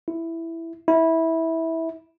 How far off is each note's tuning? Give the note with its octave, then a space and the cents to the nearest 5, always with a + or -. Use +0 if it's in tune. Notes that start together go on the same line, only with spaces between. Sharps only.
E4 +5
E4 -15